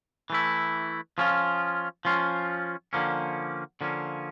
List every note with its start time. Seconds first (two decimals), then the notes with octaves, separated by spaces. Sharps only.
0.30 E3 A3 E4
1.18 F3 C#4 F4
2.05 F3 C#4 F4
2.93 D3 F3 A#3 C#4
3.81 D3 F3 A#3 C#4